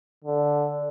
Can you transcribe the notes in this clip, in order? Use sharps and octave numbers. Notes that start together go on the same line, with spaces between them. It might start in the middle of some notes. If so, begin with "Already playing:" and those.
D3